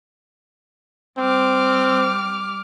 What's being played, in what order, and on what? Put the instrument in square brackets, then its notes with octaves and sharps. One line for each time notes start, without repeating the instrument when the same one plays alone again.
[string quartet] G3 D6 F6 [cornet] C4